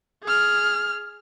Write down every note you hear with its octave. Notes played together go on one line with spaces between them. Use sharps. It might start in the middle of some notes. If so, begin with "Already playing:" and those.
G#4 F6